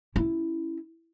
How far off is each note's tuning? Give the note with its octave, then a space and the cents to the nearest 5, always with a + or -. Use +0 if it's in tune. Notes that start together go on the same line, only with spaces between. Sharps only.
C#4 +0 E4 +0